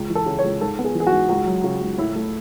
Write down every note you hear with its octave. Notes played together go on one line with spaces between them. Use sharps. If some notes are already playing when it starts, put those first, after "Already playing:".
Already playing: C#2
E3
A4
C#3
C#5
C#2
G#2 A4
B3
G#4
E3
G#4
F#4
G#2
C#2 F#4
F#3
C#3 F#4
C#2
A2 E4
A3